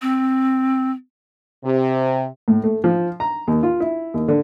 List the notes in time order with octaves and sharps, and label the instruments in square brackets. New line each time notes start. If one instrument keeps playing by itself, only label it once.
[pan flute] C4
[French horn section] C3
[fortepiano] A2
A3
F3
A#5
D#2
F4
E4
D#2
D3